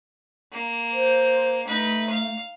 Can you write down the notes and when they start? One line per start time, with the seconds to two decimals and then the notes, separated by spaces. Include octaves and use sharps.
0.52 A#3
0.93 C5
1.67 A3 D#4 B4
2.09 F5